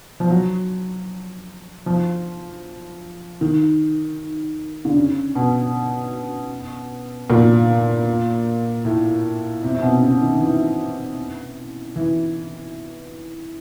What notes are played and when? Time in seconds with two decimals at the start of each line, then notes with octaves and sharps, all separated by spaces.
0.20 F3
0.31 F#3
1.86 F3
3.41 D#3
4.85 D3
4.97 C#3
5.35 B2
7.30 A#2
8.85 A2
9.63 C3
9.75 C3
9.82 B2
10.01 C#3
10.21 D#3
10.40 E3
11.96 E3